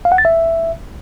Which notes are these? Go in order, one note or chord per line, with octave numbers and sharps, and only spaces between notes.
F5
F#5
A6
E5